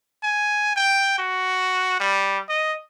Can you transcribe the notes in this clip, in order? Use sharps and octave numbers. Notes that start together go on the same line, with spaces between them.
G#5
G5
F#4
G3
D#5